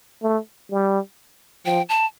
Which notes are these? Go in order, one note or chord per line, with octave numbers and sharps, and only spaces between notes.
A3
G3
F3 G5
A5